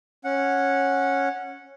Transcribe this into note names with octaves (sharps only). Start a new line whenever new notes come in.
C#4 F#5